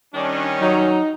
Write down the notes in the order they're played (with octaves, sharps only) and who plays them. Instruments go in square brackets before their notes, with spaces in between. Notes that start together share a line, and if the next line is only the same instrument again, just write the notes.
[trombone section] D#3 G3 C#4 [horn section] D4
[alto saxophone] F#3 [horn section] D#4